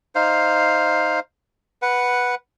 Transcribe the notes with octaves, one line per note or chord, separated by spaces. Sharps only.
D#4 C5 F5
B4 F#5